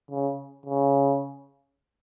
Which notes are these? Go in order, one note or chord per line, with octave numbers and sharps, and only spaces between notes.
C#3
C#3